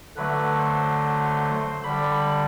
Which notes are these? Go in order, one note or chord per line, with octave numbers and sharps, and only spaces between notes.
D3 F#3 A3 B4
C5
D3 G3 B5